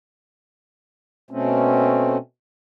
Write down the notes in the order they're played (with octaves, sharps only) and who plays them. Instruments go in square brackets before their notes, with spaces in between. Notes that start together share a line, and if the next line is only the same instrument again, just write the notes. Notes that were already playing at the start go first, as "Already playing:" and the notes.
[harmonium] B2 A3 C4 C#4